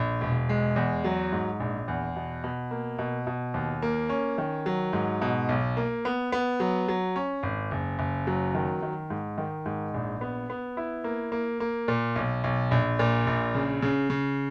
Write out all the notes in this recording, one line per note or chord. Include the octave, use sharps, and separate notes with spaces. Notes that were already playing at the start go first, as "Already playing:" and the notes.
Already playing: A#1
E1
G#3
E2
F#3
G#2
A#1
E2
B2
B2
A#3
B2
B2
D#2
A#3
C#4
D#3
F#3
G#2
B2
B1
A#3
B3
B3
F#3
F#3
C#4
G#1
F#1
F#1
F#3
D#3
D#3
G#2
D#3
G#2
A#1
B3
B3
E4
A#3
A#3
A#3
A#2
B1
B1
A#1
A#2
A#1
C#3
C#3
C#3